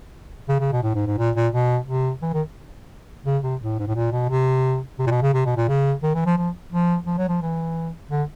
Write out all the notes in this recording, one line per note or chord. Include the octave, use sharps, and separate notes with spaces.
C#3
C#3
B2
A2
G#2
G#2
A#2
A#2
B2
C3
E3
D#3
C#3
C3
A2
G#2
A2
A#2
B2
C3
C3
A#2
B2
C#3
C3
B2
A#2
C#3
D#3
E3
F3
F3
F3
F3
F#3
F3
E3
D3